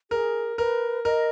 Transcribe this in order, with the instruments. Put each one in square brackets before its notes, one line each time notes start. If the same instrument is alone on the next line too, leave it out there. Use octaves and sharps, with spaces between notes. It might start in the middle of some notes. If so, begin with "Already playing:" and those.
[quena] G#4 [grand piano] A#4
[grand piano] A#4 [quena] B4
[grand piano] A#4 [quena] D#5